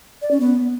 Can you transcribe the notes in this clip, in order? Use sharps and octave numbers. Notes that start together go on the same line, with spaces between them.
D5
C#4
B3